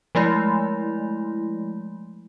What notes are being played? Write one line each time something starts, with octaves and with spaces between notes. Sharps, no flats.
F3 G#3 A3 E4